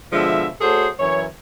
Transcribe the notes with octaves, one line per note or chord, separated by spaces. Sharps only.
B2 D3 F3 G#3 E5
A3 F#4 G#4 A4 C5 C#5
F#2 E3 E4 C#5